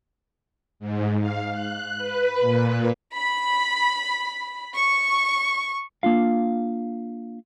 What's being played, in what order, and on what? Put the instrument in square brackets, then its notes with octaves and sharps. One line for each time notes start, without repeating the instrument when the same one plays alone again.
[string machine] G#2
F5
F#6
B4
A#2
[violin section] B5
C#6
[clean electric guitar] A#3 D4 F4 F5